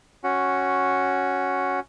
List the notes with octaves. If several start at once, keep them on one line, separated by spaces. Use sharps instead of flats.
C#4 F#4